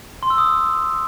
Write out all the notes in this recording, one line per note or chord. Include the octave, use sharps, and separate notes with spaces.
C6
E6
D#6